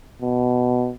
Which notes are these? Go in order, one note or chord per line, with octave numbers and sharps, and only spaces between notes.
B2